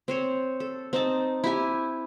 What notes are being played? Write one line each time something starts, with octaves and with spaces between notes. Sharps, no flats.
C4 C5 C#5
A4
C4 D#4 A5
E4 G4 G#5